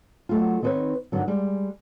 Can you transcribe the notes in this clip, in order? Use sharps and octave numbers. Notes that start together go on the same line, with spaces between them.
F#3 A3 F4
D#3 C4 D#4 A4 B4 C#5
G2 D3 D#3 F#3
G3 G#3